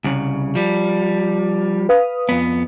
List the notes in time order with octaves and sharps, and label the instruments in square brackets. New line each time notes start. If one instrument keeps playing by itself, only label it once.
[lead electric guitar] C2 C#3
F3 G3
[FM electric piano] B4 F5 D#6
[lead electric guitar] F2 B3